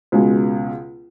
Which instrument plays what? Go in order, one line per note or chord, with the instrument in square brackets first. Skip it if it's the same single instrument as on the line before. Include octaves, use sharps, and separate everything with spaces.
[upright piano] C#2 B2 G#3